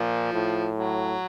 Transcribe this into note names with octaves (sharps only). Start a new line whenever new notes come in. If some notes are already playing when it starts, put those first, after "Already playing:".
Already playing: A#2 F3
A2
F#3